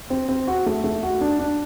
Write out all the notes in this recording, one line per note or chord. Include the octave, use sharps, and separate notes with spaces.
C4
C4
F#4
A3
A3
F#4
D4
D4